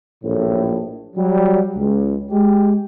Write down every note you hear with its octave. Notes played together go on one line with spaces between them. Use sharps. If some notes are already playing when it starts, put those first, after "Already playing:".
A#1 F#2 A2
F#3 G3
C#2
G#3 G4